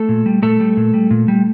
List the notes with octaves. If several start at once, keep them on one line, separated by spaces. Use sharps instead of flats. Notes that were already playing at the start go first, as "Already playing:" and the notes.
Already playing: A3 A4
A#2
G3
A#2 A3 A4
G3
A#2
G3
A#2
G3